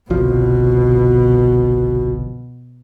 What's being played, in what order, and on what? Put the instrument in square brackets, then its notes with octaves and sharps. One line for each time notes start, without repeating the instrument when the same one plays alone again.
[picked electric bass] G1 C2 F3 [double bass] B2 [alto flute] F#4